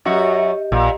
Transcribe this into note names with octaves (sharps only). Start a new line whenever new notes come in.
F#2 F#4 G4 D#5
A#1 A#2